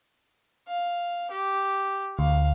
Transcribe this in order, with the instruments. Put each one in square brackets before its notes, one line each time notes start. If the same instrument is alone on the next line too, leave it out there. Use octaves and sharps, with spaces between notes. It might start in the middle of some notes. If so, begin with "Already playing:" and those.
[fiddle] F5
G4
[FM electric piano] D2 [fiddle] F5